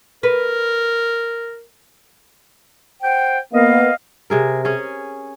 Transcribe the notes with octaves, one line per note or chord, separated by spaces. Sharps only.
A#4 B4
C5 F#5 G5
A#3 B3 D#5 F5
C3 G#4 A#4
C#4 G#4